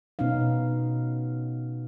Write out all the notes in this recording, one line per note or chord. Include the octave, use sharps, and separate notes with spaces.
B2 B3 C#4 D#4 F5